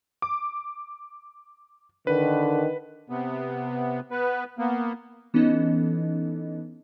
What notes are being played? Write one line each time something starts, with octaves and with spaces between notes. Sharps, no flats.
D6
D3 D#3 B4
C3 B3
B3 B4
A#3 B3
E3 B3 C#4 D#4 A4 D#5